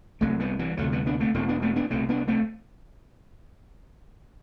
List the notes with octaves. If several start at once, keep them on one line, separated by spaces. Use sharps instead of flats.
C2 C3 F#3 A3
G3 B3
E3 G3
D2 C3 F#3 A3
G3 B3
B3 D4
A3 C4
E1 E2 B2 A3 C4
B3 D4
A3 C4
B3 D4
C2 B2 A3 C4
B3 D4
A3 C4